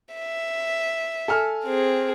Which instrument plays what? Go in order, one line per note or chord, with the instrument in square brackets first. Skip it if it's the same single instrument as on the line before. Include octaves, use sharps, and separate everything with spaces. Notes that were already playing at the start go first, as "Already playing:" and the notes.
[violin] E5
[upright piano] A4 G#5 F6
[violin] C4 G#4